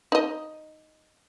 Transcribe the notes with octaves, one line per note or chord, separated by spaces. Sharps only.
D#4 D#5